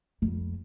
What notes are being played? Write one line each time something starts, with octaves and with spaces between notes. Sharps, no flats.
F2